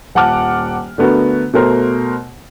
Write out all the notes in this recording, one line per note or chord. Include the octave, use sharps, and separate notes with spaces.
D#1 F#5 A5 D6 F6
D3 A3 B3 F#4 A#4
B2 A3 A#4 C5